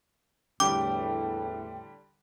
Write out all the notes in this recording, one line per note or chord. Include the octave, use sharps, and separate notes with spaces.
E2 A2 D3 G3 G5 D6